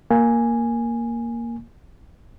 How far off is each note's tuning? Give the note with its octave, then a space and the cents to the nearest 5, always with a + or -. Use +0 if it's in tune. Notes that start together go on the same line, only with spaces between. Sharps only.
A#3 +0 G#5 +0